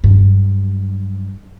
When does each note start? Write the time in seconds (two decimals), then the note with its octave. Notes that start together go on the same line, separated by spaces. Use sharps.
0.04 G2 F#3